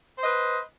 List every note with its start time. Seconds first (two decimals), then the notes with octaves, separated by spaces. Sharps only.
0.18 C5
0.21 D#5
0.25 B4